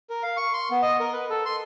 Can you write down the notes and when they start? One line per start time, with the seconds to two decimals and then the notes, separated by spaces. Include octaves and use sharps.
0.10 A#4
0.23 F5
0.37 C#6
0.53 C6
0.71 B3
0.82 D#5
1.00 A#4
1.13 B4
1.30 A4
1.45 C6